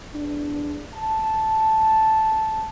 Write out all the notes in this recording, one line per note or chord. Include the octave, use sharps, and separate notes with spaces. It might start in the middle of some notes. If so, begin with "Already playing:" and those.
E2 D4
A5